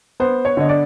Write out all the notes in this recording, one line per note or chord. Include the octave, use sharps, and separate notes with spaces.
B3 C5
C#5
D3 D#5
D5